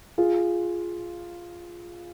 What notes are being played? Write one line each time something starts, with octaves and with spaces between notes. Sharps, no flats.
F4 G#4